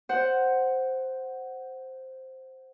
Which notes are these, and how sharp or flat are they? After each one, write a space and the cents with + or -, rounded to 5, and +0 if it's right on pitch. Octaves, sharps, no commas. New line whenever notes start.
C5 +0 F#5 +5